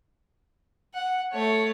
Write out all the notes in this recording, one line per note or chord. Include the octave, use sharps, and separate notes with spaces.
F#5
A3 C#5